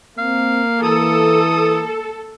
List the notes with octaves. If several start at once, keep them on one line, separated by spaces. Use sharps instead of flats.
A#3 C4 F5
E3 A4 D#6